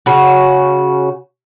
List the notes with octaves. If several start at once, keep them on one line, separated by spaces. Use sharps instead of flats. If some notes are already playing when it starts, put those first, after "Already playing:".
C#3 F#4